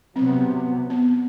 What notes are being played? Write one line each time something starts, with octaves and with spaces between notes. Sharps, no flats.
C3 F#3 B3 C4
B3